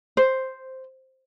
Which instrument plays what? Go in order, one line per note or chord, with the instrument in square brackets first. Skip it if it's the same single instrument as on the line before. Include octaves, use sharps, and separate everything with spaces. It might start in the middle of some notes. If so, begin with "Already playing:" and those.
[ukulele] C5